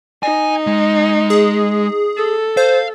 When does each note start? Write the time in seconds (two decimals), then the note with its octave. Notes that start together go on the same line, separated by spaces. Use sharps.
0.23 D#4 G#5
0.67 G#3
1.30 G#4
2.17 A4
2.57 C5 F5